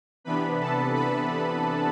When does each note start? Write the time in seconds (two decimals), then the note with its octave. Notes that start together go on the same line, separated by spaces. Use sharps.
0.24 C3 E3 B3 D4 B4 B5
0.60 A4 A5
0.95 B4 B5